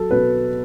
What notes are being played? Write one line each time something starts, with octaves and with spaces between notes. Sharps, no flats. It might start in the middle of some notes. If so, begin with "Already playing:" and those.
Already playing: F#3 A4
B2 B4